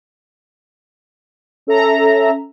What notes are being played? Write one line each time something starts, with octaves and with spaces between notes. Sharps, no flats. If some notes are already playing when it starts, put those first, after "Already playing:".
C#4 A4 E5 A#5